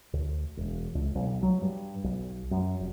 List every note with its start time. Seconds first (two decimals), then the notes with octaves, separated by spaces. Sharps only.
0.13 D2
0.57 E1
0.95 C#2
1.15 B1
1.43 F#3
1.62 G2
2.04 B1
2.51 F#2
2.79 F1